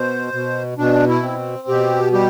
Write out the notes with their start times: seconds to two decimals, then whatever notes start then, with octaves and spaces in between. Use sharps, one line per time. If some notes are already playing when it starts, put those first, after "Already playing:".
Already playing: B2 C5
0.33 B2
0.78 B2 D4
1.08 E4
1.23 C4
1.68 B2 G4
2.13 G3 G4